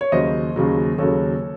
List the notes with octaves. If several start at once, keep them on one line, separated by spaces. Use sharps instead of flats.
C#5
D#2 C#3 F#3 C5 D#5
D#2 C#3 F#3
D#2 C#3 F#3 A4 C#5